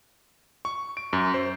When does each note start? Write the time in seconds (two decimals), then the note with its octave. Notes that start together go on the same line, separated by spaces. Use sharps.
0.65 C#6
0.97 D7
1.13 F#2
1.34 C5